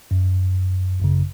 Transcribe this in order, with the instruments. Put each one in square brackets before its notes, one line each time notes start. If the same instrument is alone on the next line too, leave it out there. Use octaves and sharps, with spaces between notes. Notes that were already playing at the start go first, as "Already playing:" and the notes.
[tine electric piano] F#2
G#1 F#2 C#3